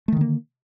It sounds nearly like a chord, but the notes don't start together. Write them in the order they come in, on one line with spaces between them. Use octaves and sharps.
A3 D#3 D3 A#3